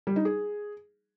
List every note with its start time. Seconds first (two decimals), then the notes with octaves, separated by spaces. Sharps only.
0.07 G3
0.16 D#4
0.25 G#4